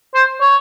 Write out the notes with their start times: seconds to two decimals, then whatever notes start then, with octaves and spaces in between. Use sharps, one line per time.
0.14 C5
0.41 C#5